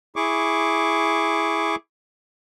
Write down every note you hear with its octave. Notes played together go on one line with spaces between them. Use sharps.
E4 G#4 C#6 D6